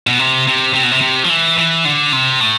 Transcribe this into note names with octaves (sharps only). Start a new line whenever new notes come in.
B2
C3
C3
C3
B2
C3
C3
F3
E3
E3
D3
C3
A2